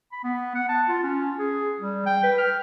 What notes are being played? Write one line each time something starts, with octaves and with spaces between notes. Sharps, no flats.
B5
B3
F#5
A5
F4
C#4
G#4
G3
G5
B4
F6